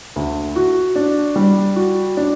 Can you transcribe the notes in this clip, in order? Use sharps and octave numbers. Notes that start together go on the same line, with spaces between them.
D2
F#4
D4
G3
F#4
D4